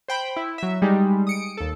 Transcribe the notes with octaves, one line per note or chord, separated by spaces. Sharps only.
C5 G5 B5
E4
F#3 E5
G3 G#3 D#4
D#6 C#7 D7
D#2 A4